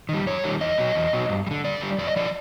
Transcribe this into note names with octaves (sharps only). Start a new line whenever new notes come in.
D#3 G3
F#2 C#5
D#3 G3
E2 D#5
B2 F#3
E2
B2 F#3
G2
G3
D3
G2 D5
D3 G3
F2 D5
D#5
D3 F3 D5